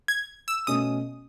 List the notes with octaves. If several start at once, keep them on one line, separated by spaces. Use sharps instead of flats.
G#6
E6
B2 A3 C#4 D#6